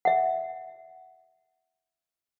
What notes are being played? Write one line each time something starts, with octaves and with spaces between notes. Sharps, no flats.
E5 F#5